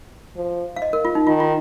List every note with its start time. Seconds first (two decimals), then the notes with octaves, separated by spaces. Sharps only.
0.37 F3
0.76 F5
0.82 D#5
0.93 A#4
1.05 F4
1.15 D#4
1.27 D#3 F4
1.40 F4